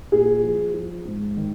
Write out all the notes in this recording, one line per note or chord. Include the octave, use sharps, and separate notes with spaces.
A#2 G#4
F3
F3
G#2
D#3